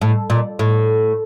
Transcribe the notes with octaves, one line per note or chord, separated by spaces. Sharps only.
A2
A#2
A2